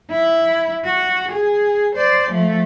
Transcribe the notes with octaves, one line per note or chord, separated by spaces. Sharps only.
E4
F#4
G#4
C5 D5
F3 A3